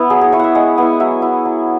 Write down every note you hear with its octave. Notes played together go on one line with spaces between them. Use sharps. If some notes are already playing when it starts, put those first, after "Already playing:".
Already playing: B3 E4 B4
F#3 G#4
G#4
E4 C#5
E5 F#5
G#3 F#5
B3 E4 G#5
F#5
F#3 E5
E4
F#3